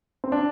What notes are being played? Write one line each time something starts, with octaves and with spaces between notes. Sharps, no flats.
C4
D4